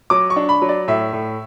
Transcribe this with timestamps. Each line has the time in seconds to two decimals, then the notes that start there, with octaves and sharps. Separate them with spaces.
0.10 F#3 D6
0.30 C#6
0.36 D4
0.49 B5
0.62 F#3
0.69 D5
0.88 A2 E5
1.13 A2